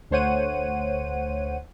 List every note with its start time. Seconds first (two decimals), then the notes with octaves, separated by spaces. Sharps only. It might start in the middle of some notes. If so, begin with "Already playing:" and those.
0.11 D2 A3 C5 C#5 F#5 D#7